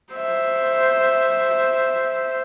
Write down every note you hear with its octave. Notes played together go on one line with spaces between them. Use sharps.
C5 E5